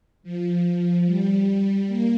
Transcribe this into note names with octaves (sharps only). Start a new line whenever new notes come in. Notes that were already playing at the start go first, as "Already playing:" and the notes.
F3
G3
A#3